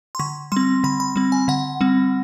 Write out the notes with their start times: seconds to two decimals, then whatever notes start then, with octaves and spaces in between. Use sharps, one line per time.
0.15 C6
0.19 D3 C#6
0.52 G3 C4 C6
0.84 D3 B5
1.00 B5
1.16 G3 C4
1.32 G#5
1.48 D3 F#5
1.81 G3 C4